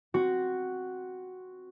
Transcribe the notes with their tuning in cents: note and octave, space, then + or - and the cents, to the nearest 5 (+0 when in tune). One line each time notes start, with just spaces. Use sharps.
C4 +0 F#4 +0